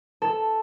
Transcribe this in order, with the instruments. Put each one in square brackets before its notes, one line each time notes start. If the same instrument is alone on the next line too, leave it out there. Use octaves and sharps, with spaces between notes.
[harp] A4